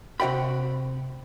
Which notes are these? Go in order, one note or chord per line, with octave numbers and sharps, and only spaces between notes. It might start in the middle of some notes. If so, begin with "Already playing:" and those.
C3 F#4 D#5 G5 B5